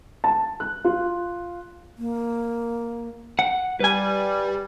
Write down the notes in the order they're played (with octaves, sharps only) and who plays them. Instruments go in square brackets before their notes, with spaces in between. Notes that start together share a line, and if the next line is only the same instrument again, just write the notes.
[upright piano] A5
F#6
F4
[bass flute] A#3
[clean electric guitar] F#5
[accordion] G3 [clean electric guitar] B4 G#5